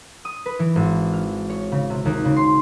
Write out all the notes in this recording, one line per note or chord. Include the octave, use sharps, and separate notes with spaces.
D#6
B4
E3
G#1
F6
C#5
C#3
C3
D#2
C#3
C6